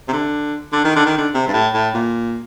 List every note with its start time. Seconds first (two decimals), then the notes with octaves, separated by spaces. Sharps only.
0.08 C3
0.13 D3
0.73 D3
0.85 D#3
0.96 D3
1.06 D#3
1.18 D3
1.34 C3
1.47 G2
1.53 A2
1.74 A2
1.94 A#2